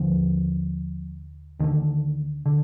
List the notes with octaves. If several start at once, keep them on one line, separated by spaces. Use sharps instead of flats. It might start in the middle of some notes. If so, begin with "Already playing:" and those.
Already playing: D#2 D3 F3
D2 D3 D#3
D3